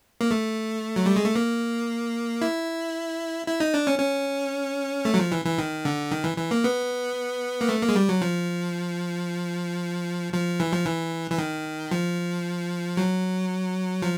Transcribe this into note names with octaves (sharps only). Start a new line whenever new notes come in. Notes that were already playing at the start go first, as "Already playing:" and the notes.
A#3
A3
F#3
G3
G#3
A3
A#3
E4
E4
D#4
D4
C#4
C#4
A3
F#3
F3
E3
E3
D#3
D3
D#3
E3
E3
A#3
B3
A#3
A3
A#3
G#3
G3
F#3
F3
F3
E3
F3
E3
E3
D#3
F3
F#3
F3